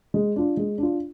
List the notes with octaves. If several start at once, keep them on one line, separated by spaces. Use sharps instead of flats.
G#3
D4 F4
G#3
D4 F4